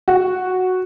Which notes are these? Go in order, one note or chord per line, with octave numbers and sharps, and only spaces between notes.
F#4